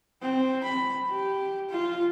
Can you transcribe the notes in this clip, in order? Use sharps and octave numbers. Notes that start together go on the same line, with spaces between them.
C4
B5
G4
F4